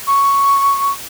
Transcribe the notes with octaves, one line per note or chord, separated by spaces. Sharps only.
C#6